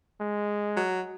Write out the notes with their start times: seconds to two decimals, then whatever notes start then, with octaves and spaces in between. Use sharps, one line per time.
0.21 G#3
0.77 F#3